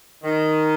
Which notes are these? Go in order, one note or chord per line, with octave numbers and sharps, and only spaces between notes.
D#3